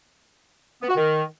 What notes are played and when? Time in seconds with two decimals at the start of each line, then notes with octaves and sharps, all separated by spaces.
0.82 B3
0.89 F#4
0.96 D#3